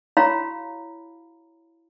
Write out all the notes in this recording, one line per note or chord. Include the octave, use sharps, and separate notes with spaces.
E4 F#4 C#5 F5 A#5 B5